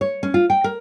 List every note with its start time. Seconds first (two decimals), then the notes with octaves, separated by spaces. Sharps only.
0.01 C#5
0.23 C#4
0.34 F4
0.50 G5
0.64 A#4